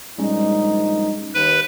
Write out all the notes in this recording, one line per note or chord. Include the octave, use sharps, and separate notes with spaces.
A#1 G3 G#3 C#4 D#4
D#2 B4